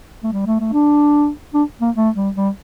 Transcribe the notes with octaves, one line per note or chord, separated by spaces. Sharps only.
A3
G3
A3
A3
D4
D4
A#3
A3
G3
G3